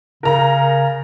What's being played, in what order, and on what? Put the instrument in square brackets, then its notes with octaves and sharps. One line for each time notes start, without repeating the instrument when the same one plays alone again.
[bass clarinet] C#3 [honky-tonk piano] A#4 A#5